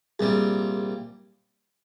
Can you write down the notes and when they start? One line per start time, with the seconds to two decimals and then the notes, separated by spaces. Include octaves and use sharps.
0.19 C2 A#2 G3 G#4